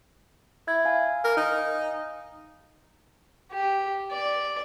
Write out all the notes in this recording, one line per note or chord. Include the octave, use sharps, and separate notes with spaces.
E4 G#6
F5 G#5
A#4
D#4
G4
D5